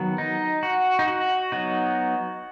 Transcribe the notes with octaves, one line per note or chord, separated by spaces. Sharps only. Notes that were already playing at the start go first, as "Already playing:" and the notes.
Already playing: D#3 F#3 B3
D#4
F#4
D#4
F#4
F#3 B3 D#4